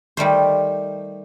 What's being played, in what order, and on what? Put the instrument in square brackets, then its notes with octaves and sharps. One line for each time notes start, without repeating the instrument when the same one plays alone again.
[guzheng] D#3 G3 A3 C5